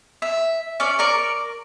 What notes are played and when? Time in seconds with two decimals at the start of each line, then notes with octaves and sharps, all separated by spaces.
0.22 E5
0.80 C#4 D5
0.99 A#4 D5 C#6